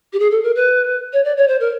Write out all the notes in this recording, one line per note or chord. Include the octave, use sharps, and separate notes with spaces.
G4
G#4
A4
A#4
B4
C#5
D5
C#5
C5
A#4